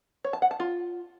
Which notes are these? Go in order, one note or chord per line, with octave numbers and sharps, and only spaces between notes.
C#5
A5
F#5
A5
F4